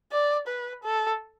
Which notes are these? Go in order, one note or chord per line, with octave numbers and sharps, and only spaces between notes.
D5
B4
A4